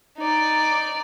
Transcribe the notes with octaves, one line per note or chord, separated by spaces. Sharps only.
D#4 D5